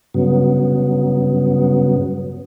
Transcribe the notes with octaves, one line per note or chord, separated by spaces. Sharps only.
G2 C#3 F#3 B3